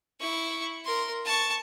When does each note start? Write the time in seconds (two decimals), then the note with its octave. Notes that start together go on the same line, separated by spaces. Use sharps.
0.20 E4 C#6
0.85 A#4 C6
1.25 A5 C#6